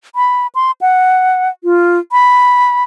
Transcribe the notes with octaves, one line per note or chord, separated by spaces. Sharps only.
B5
C6
F#5
F4
B5